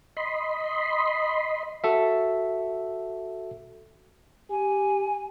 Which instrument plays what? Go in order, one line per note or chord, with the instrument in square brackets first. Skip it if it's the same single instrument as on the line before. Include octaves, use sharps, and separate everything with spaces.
[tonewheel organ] D#5 B5 C6
[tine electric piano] F#4 A4 E5
[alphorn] G4 [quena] G#5